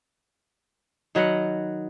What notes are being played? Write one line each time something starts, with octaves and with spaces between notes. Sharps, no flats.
D#3 F#3 B4 F#5